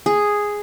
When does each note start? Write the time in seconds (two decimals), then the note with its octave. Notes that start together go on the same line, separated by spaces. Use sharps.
0.06 G#4